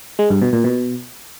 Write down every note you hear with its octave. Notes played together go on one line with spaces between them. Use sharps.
G#3
G2
B2
A#2
B2